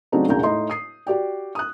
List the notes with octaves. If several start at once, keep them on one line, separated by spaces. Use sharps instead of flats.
C#3 F#3 A3 C4 D4 D#4
E1 A#1 E2 C#3 A#5 G6
A2 D#4 E4 D#5 C6
D#6 C7
F#4 G4 D5 G5
D#6 F#6